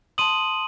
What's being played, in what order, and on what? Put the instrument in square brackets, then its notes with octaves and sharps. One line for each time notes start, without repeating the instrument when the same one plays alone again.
[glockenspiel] A5 C6 D#6 D#7 F#7